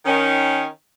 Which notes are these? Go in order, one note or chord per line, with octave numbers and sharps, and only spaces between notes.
D#3 C#4